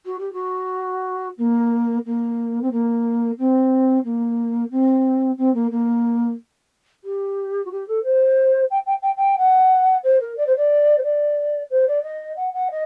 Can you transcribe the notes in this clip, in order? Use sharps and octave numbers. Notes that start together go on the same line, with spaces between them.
F#4
G4
F#4
A#3
A#3
C4
A#3
C4
A#3
C4
C4
A#3
A#3
G4
F#4
G4
A4
C5
G5
G5
G5
G5
F#5
C5
A#4
D5
C5
D5
C5
D5
C5
D5
D#5
F#5
F#5
D#5